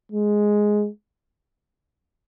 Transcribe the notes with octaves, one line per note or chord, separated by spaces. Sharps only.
G#3